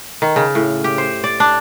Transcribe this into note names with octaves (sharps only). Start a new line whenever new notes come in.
D#3
C#3
A2
G4
C5
D5
D4